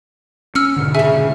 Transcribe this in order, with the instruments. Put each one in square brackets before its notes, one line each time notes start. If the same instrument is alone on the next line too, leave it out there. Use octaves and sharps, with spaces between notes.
[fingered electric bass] C#4 [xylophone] E6 F6 C#7
[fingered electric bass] G#2 B2 D3
[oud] C#3 G#4 [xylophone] E5